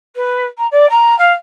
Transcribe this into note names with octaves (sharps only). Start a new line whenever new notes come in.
B4
A#5
D5
A#5
F5